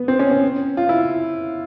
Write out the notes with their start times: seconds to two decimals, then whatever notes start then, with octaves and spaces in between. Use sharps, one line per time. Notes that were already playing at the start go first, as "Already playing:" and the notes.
Already playing: B3
0.08 C4
0.19 C#4
0.31 C#4
0.77 F4
0.89 E4